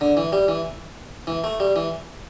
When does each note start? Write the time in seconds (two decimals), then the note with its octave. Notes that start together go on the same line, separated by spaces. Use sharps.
0.01 D3
0.17 E3
0.32 G3
0.48 E3
1.27 E3
1.44 A3
1.60 G3
1.76 E3